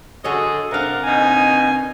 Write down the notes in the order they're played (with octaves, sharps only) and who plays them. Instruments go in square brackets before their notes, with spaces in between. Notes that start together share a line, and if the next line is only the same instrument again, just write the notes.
[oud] D3 F#4 C#5 [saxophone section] G#4 A4 D#5
[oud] C3 D4 [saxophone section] A#4 F5 F#5
[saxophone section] D#2 B2 D#4 [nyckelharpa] G#5